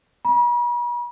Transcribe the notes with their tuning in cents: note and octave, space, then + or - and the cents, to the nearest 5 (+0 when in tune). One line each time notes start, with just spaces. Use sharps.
B5 -45